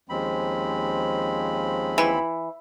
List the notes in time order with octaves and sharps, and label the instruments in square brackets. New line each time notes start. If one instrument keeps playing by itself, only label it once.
[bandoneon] D#2 C4 B5 [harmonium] F3 G#3 C#4
[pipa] E3